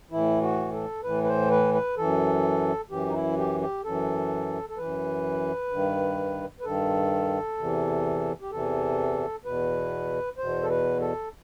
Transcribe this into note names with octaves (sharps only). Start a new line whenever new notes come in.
A2 E3 E4
F#4
A4
A2 E3 B4
B4
C5
B4
B4
F#2 E3 A4
F#2 E3 G4
D#4
E4
G4
G4
F#2 E3 A4
A4
F#2 E3 B4
G2 D#3
B4
G2 D#3 A4
E2 C3 E3
G4
E2 C3 E3 A4
E2 B2 B4
E2 B2 C5
A4
B4
A4